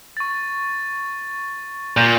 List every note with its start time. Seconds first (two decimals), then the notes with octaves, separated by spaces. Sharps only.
0.17 C#6 A6
1.97 A#2 G6 A#6